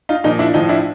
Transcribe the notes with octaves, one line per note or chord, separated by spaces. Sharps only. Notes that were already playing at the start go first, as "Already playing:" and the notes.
D#4 F4
A#2 F3 D#4
D4 E4
A2 F3 D#4
D4 E4